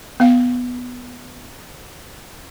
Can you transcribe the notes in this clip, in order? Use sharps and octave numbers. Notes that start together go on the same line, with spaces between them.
B3 F5